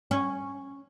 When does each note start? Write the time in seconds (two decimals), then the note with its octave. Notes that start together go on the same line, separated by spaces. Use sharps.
0.11 C#4